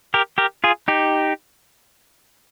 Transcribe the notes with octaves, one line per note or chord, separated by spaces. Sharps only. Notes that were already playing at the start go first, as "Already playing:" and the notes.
G4 A#4
G4 A#4
F4 G#4
D#4 G4